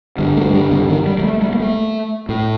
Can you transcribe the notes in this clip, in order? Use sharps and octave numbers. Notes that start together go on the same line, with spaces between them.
G2 D3 G3
A3
G3
D3
D#3
G3
G3
A3
G3
A#3
A3
A2